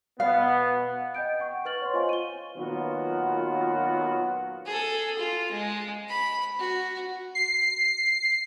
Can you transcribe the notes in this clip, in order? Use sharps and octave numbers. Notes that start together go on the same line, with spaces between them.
B2 B3 F5
D#5 G5 G6 D7
F#5 G5 C#6
B4 C#6 F6 A6 F#7
C#5 C6
F4 C5 D#5 F5 G#5 C#6
D#7 G7
A#2 D#3 F#3 B3 F4 F#4
G#4 A4
F4
G#3
B5
F#4
C7